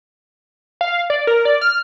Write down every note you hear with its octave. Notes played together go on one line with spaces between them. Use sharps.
F5
D5
A#4
D5
F6